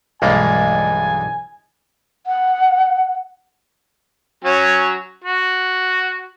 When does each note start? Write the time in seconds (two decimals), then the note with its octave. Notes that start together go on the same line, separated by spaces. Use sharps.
0.22 B1 G2 E3 G#3 A#3 D4 G#5
2.26 F#5
4.44 F#3 C#4
5.24 F#4